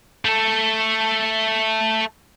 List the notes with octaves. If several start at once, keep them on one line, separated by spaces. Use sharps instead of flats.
A3 A4